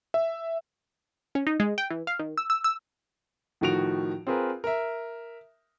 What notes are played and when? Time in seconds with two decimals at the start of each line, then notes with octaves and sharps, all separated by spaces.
0.14 E5
1.35 C#4
1.47 D#4
1.60 G#3
1.78 G5
1.90 E3
2.07 F5
2.19 D#3
2.37 E6
2.50 E6
2.64 E6
3.61 A2 D#3 F3 F#4 D7 F7
4.27 C4 F4 G#4 A#4 B4
4.64 A#4 E5